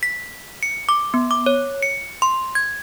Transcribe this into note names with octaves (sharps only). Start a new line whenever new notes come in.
B6
C#7
D6
B3
D6
C#5
C#7
C6
G#6